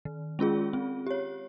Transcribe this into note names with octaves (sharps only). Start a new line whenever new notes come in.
D#3
G#3 C#4 F4 G#4
C4
G4 C#5